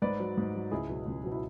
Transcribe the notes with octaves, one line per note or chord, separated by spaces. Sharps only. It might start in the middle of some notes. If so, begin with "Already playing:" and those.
G#2 B4 D5
F#3
G#2
F#3
C#2 E4 G#4
B2 F#3
C#2
B2 F#3
E4